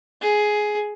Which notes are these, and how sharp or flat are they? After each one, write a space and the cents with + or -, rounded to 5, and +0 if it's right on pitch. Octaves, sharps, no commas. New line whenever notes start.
G#4 +10